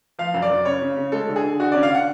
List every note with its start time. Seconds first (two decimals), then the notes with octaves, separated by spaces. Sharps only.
0.19 F3 F5
0.34 F#2
0.42 D5
0.50 F#2
0.65 C#3 C#5
0.82 C#3
0.97 C#3
1.12 G#3 A4
1.29 D3
1.36 G#4
1.44 D3
1.60 D3 F#4
1.72 C#4 D5
1.83 F5
1.90 D3 F#5